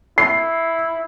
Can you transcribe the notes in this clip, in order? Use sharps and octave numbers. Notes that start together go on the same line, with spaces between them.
E4 C7